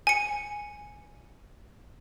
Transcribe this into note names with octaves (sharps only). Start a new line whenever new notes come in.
G#5 C#7